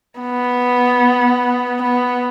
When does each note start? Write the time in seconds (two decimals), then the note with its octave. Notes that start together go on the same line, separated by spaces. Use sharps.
0.20 B3
1.82 B3